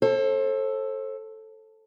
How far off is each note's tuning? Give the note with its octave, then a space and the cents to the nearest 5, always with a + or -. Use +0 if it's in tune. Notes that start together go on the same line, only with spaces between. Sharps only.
A4 +0 C5 +40